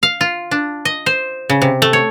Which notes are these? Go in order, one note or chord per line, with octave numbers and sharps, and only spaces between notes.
F5
F4
D4
D#5
C5
C#3
C3
A3
C#5